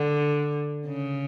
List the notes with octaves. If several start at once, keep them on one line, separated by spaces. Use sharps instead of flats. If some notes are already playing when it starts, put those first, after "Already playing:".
Already playing: D3
C#3